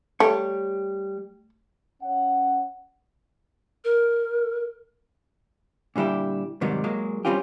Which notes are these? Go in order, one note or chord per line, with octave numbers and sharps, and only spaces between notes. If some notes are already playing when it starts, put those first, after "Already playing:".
G3 A3 G4 C#5
C#4 F#5
A#4
A#2 D3 G3 E4 G4
G#2 C3 D#3 F#3 G3
F#3 G#3 A#3
G3 G#3 C4 C#4 F4 G4